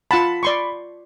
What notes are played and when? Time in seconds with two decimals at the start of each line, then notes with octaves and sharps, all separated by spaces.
0.11 F4 F#5 A5 B5
0.43 D5 C6 C#6